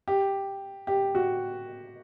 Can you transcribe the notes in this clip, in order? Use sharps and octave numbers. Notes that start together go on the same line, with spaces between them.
G4
G4
F#4